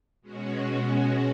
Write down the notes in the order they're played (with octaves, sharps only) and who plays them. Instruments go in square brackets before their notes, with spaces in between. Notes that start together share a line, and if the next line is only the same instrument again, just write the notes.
[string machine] B2 G#3 C#4 F#4